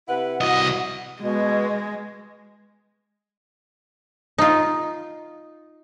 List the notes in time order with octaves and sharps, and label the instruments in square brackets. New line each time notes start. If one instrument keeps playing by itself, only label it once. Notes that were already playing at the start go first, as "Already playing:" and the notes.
[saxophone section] C3 E4 B4 [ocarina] F#5
[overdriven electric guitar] C2 D#5 [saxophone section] E4 F#4
[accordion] B2 [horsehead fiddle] G#3
[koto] D#4 F4